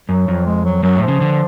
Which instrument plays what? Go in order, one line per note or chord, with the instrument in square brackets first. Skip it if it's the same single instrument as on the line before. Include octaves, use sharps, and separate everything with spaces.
[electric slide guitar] F#2 [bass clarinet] F#3
[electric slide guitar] F2
[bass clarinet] G#3
F#3
[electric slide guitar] F#2 [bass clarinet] F#3
[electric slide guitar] A2
[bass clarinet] F3
[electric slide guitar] C#3
D3